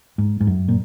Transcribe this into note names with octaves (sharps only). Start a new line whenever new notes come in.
G#2
G#2
F#2
A#2